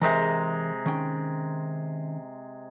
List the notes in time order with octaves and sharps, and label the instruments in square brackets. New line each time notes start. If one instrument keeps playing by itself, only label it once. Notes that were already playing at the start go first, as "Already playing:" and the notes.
[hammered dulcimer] C3 G#3 A#5 [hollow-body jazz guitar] E3 A#4
[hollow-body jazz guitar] D#3 C#4 G5